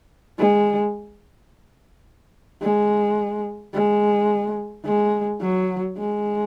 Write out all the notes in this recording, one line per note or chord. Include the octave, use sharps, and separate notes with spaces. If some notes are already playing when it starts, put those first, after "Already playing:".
G#3
G#3
G#3
G#3
F#3
G#3